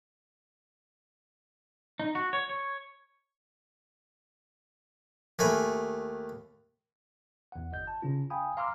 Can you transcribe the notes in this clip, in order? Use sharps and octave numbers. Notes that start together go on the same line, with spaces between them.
D#4
F#4
C#5
C#5
D#2 A3 G#5 B5
E2 F#5
G1 D#5 G6
A5
C#3 C#4 F4
F5 G5 G#5 B5 D#6
F5 A#5 C6 D6 E6 F6